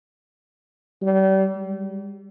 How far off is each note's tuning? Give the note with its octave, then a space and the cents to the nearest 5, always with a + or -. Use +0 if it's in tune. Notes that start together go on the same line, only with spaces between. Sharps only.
G3 -35
G3 +40